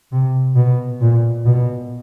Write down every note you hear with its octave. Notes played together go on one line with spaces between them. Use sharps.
C3
B2
A#2
B2